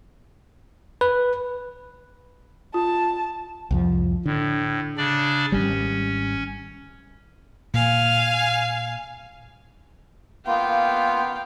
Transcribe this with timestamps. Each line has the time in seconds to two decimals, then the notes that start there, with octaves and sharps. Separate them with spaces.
1.01 B4
2.74 F4 A5
3.71 C2 F2 F3
4.26 A2 D3
4.97 C#3 D4 D5
5.52 G#1 G3 C#4
7.74 A#2 F5 G#5
10.47 A#3 B3 F4 F5 G5